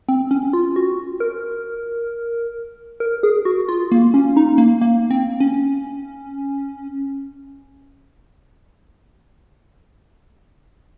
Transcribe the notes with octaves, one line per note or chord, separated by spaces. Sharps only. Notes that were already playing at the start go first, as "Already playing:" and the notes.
C4
C#4
F4
F#4
A#4
A#4
G#4
F#4
F4
A#3
C#4
D#4
A#3
A#3
C4
C#4